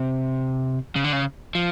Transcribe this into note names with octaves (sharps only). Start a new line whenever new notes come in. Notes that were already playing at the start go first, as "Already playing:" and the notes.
Already playing: C3
C#3
D3
C#3
F3